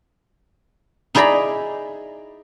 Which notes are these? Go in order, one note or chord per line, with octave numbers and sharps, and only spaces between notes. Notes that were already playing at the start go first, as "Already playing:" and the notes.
D#4 E4 G#4 D5 A#5 B5